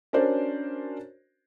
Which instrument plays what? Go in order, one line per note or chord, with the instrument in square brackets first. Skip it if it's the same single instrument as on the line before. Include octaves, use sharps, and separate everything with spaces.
[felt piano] C#4 D4 F#4 A#4 C5 D5